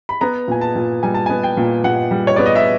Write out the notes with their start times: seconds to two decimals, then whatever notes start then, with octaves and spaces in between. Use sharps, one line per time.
0.09 B5
0.21 B3 A#5
0.48 A#2 G#5
0.61 A5
0.76 A#2
1.03 G3 G#5
1.14 A5
1.26 B3 G#5
1.43 G5
1.57 A#2
1.84 A#2 F#5
2.11 G3
2.27 C#5
2.36 B3 D5
2.46 D#5
2.55 E5